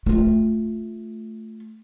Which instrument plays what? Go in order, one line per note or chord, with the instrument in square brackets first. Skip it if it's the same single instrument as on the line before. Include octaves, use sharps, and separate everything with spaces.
[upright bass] A3 F4